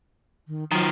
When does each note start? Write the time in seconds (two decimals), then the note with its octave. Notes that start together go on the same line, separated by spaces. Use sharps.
0.48 D#3
0.72 D#3 F3 F#3